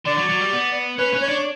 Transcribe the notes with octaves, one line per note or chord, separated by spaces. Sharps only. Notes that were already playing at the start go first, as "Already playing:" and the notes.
D3 D5
F#3
F#3
G3
B3
C#4 B4
C#4
C#5
D4